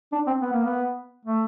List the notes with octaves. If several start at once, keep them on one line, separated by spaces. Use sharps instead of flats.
D4
C4
B3
A#3
B3
A3